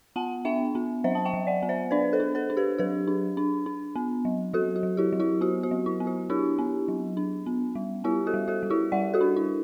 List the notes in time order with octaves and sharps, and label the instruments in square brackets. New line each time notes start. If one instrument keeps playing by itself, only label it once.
[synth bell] B3 F#5 A5
D4 E5 G5
B3
F#3 C5 E5
A5
E5 G5
F#3
D5 F#5
B3
C5 E5
D4 B4 D5
A4 C5
D4
A4 C5
D4
G4 B4
F#3 G4 B4
D4
D4
D4
B3
F#3
F#3 F#4 A4
F#4
F#3
E4 G4
F#3
E4 G4
B3 F#4
F#4
F#3
E4
B3
F#4
D4 E4 G4
B3
F#3
D4
B3
G3
B3 E4 G4
F#4 A4
G3
F#4 A4
G3
E4 G4
G3 D5 F#5
F#4 A4
D4
E4